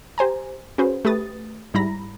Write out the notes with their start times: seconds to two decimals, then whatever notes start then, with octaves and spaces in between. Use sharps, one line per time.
0.18 G4 C5 G#5 A#5
0.78 C#4 F#4 G#4 B4 C5
1.05 A3 G4 B4 D#6 A6
1.74 G#2 G3 E4 A#5 B5 A#6